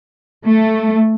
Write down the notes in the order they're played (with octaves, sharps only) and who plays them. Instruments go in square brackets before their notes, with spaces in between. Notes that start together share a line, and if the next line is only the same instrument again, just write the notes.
[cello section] A3